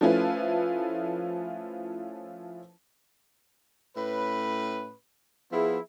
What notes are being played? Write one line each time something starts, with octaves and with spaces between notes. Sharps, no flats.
F3 A3 C#4 E4 F4 B4
A2 C#4 B4
F3 B3 E4 G#4